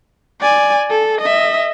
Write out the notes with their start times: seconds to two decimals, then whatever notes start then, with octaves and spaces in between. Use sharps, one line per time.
0.41 D5 G#5
0.90 A4
1.22 D#5 E5